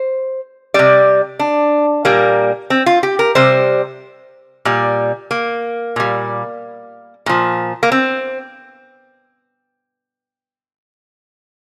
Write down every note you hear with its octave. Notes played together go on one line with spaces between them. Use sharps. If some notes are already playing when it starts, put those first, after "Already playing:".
Already playing: C5
C3 G3 D5
D4
A#2 G3 A#3
C4
F4
G4
A#4
C3 G3 C5
A#2 G3
A#3
A#2 G3
A#2 F3
A#3
C4